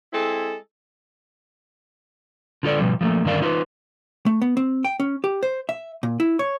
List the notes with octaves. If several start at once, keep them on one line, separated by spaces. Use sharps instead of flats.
G#3 C4 E4 A4
D3 F4 A4 D5
B2 F3 G3
F3 A3 A#3
G2 D3 D#3 A#4 D5 F5
D#4 F4 B4
A3
B3
C4
G5
C#4
G4
C5
E5
A#2
E4
C#5